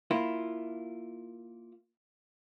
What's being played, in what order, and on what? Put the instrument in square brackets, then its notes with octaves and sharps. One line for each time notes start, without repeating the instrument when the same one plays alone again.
[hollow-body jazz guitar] A#3 E4 F4